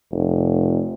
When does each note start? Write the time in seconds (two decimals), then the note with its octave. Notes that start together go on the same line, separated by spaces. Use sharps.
0.12 F1